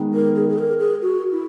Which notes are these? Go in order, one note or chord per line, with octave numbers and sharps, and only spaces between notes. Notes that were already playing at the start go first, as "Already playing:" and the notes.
Already playing: D#3 G#3 B3
A#4
G#4
G#4
A#4
G#4
F#4
E4